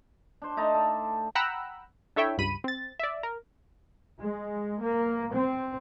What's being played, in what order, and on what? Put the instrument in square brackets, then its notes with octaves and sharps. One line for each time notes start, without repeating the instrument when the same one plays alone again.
[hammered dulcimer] D4 C5
A3 D#4 A5 A#5
A4 D5
[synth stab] F#5 G5 A#5 B5 E6 F#6
D4 E4 A4 C#5 E5 G5
C#2 G2 B5 D#7
C4 A6
D5 E5
A#4
[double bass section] G#3
A#3
C4